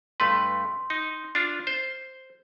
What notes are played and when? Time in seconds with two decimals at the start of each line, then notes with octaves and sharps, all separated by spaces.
0.20 G2 A3 B4 C6
0.90 D#4
1.35 D4 F4
1.67 C5